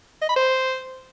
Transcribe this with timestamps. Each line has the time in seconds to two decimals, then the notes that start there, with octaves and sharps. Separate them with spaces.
0.22 D#5
0.29 B5
0.36 C5